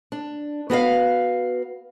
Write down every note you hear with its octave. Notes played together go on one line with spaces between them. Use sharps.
D4
B3 F#4 B4 F5